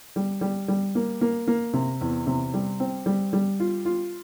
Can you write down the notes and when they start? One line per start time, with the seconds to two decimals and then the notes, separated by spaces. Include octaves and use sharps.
0.16 G3
0.41 G3
0.68 G3
0.95 A#3
1.21 A#3
1.47 A#3
1.73 C3
2.01 E2
2.27 C3
2.54 G3
2.80 C4
3.06 G3
3.33 G3
3.60 F4
3.85 F4